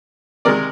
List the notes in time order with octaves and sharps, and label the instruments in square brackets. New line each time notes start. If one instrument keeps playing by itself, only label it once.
[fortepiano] C3 D#3 G#3 A#4 D5